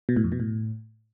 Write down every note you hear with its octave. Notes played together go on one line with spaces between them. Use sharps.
B2
A2
F2
B2
A2